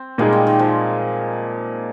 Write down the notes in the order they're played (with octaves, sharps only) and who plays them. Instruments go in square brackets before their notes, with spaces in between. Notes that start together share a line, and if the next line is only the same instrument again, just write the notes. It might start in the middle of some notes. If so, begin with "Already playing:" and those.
Already playing: [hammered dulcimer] C4
[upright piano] A#2 G#3 D#4 G#4 [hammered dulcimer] G3 A#3
[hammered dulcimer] D#3
D#3
F3